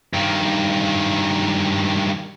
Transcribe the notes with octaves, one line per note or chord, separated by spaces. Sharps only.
G2 D#3